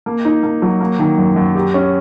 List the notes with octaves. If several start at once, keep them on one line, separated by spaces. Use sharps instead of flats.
A#3
D#4
A#3
F#3
A#3
D#3
F#2
F#2
G4
C#4